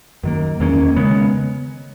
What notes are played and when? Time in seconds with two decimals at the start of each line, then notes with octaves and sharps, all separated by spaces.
0.24 F#2 D#3 A#3
0.60 E2 D#3 A#3 C#4
0.96 C#3 G#3 B3